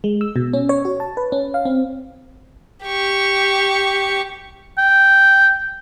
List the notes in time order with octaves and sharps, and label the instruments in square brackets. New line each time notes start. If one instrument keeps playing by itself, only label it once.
[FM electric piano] G#3
E6
B2
C#4
C#5
F#4
A5
B4
C#4
F5
C4
[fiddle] G4 C#6
[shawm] G5